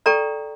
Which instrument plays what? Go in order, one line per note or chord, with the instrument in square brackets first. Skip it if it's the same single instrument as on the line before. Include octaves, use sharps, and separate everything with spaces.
[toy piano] A4 D5 G5 A#5 C#6